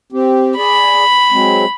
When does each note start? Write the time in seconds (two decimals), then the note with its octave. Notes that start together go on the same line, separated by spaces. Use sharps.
0.12 C4 G4
0.57 G#4 D5 B5
1.31 F#3 G#3 C4